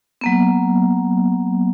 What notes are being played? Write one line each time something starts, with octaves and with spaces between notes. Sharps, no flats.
F#3 A#3 B3